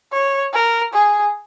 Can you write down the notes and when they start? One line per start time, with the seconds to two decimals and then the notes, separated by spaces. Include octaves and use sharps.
0.12 C#5
0.53 A#4
0.93 G#4